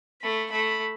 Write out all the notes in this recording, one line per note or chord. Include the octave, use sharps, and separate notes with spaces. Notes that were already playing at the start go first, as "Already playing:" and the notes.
A3 B5
A3 B5